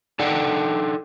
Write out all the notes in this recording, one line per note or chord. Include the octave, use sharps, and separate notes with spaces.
D4 D#4 A4 D5 F#5 G5